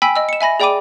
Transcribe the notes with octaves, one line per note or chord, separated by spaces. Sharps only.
G5 G#5 B5 E6 B6
D#5 E6
C#7 E7
E5 G#5 B5 A#6
G#4 D5 G5 B5 D6 D#7